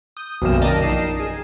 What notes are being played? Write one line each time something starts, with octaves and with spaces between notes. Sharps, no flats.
D#6 G6
B1 F#2 C3 D#3 A#3 E7
A#4 D5 D#5 G5 A5
A#1 D#4 C7 E7
G#4